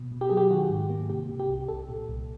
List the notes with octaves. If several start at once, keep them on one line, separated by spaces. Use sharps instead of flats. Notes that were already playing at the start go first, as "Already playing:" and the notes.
Already playing: B2
B2
G4
F#3 G#4
G4
D#3 F#4
G#2
A#3
C3 G4
C3
G4
C2
C2 A4
A#2
C2